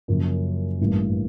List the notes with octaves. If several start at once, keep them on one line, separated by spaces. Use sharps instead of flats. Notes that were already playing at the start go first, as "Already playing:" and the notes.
F#2 C#3 F3 A#3 C#4
A1 G2 E3 G3 A#3